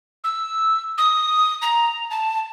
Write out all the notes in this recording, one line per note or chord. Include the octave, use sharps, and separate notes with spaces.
E6
D#6
A#5
A5